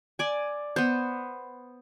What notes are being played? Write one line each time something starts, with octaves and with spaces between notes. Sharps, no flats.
D5 G#5
B3 C5